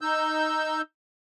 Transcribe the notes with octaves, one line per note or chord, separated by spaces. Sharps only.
D#4 E6 G6